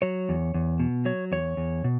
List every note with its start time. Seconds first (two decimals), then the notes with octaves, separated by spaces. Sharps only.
0.02 F#3 C#5
0.29 E2
0.54 E2
0.80 B2
1.05 F#3 C#5
1.32 E2 C#5
1.57 E2
1.84 B2